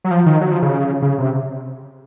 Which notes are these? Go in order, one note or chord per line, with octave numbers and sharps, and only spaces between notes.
F#3
F3
D#3
F#3
F3
C#3
C#3
C3